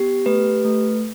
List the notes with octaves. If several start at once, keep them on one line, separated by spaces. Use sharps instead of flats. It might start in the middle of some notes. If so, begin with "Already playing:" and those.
Already playing: B3 G4
A3 B4
A3